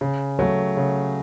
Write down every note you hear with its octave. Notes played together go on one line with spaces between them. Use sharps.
C#3
F#3 A3
C#3